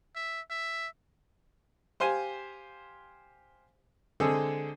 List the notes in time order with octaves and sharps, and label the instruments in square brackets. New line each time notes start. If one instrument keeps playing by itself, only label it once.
[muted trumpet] E5
E5
[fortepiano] G4 C5 F5 G#5
D3 G#3 C4 G#4 A4